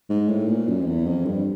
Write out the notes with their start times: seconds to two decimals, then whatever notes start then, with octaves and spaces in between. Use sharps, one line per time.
0.10 G#2
0.29 A2
0.47 A#2
0.68 F#2
0.82 F2
0.87 E2
1.06 F2
1.25 G2